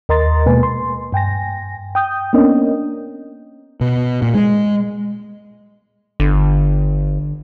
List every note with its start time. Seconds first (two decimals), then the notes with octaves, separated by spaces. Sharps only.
0.09 D#2 A#4 D#5 A#5 C6 A6
0.46 B2 G#3 A#3 B4 G#5
0.63 C6
1.12 G2 G5 G#5 A#6
1.95 G5 D#6 G6
2.33 A#3 B3 C#4 D4 A#4 D#5
3.81 B2
4.22 A#2
4.34 G#3
6.20 G1 D3